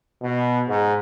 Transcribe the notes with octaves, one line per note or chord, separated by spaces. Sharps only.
B2
G#2